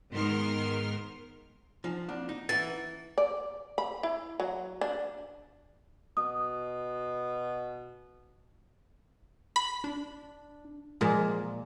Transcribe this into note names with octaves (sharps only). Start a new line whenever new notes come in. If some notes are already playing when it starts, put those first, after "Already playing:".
G#2 D#3 B3 A#4 C6 F6
F3 D4 D#4 G#5
A#3 C4 D4 E4
D#4
E3 C#4 F#5 A6
D5
B5
E4
F#3
D4
B2 D#6
B5
D4
A#2 F3 G#3 G#4 A#4